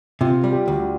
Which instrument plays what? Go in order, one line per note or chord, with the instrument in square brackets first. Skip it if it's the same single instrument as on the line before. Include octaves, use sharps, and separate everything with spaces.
[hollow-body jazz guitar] C3 [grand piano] F4
[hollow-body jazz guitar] G3
[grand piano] G4
[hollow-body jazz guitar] D2